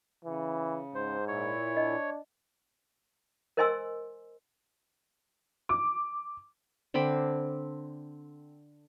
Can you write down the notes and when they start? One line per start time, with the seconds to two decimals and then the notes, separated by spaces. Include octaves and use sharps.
0.25 C#3 E3
0.95 G#2 C5
1.28 A#2 E4 C#5
1.77 D4 D#5
3.57 A#4 C5 D#5 G#5 C6 E6
5.69 D6
6.94 D3 C4 B5 D6